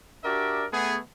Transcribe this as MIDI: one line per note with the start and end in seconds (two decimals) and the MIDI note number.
0.24 0.66 62
0.24 0.66 66
0.24 0.66 67
0.24 0.66 70
0.24 0.66 74
0.24 0.66 76
0.72 0.98 57
0.72 0.98 59
0.72 0.98 68